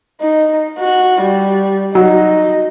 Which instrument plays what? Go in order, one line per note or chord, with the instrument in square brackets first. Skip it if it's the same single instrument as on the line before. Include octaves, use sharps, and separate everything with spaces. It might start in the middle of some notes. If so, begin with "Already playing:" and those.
[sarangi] D#4
F#4
G3
[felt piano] F#3 F#4 [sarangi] D#4